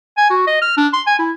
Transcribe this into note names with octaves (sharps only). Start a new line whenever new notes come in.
G#5
F#4
D#5
F6
D4
C6
G#5
E4